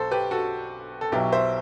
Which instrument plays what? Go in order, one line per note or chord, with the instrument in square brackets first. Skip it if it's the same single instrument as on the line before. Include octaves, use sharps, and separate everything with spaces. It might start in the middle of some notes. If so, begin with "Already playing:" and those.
Already playing: [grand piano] B1 B2 F#3 A4 C5
G4 B4
F#4 A4
A4
B1 B2 F#3 E4 G4
C5 E5